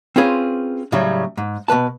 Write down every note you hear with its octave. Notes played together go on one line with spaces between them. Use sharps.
C4 C#4 F4 G#4 B4 C5
A2 C#3 F#3 G3
G#2
B2 F#3 B4 A5